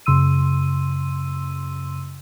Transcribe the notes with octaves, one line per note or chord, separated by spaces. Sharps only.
F#2 C#3 C6 E6 D#7